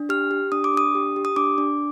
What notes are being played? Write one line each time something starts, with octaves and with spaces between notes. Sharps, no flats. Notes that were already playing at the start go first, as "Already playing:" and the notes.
Already playing: D4
G4 F6
G4
D4 D#6
D6
D4 D#6
G4
G4
D#6
D4 D6
D4